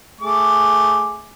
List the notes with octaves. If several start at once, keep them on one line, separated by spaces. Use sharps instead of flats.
A3 G#4 D6